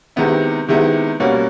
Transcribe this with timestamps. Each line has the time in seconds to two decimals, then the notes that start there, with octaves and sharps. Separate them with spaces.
0.16 C3 D#3 G#3 B3 E4
0.68 C3 D#3 G#3 B3 E4
1.20 B2 G3 A#3 C#4 F#4